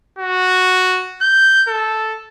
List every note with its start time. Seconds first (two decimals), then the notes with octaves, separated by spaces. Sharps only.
0.19 F#4
1.21 G6
1.68 A4